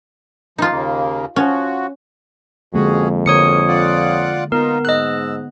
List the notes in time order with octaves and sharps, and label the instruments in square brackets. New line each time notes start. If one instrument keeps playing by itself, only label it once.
[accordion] F3 [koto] D#4 F4
[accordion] D#2 C#3 A#3
[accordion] F3 F#4 [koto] C#4
[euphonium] F2 [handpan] D3 G#3 A#3 [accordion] C#4 F#4 G#4
[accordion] G#2 B2 A#3 [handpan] D3 [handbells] C#5 D#6 C#7
[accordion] F4 D5 F#5
[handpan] B3 [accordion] D#4 F4 [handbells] A#4
[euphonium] G#2 [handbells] D#5 F#6 [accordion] E6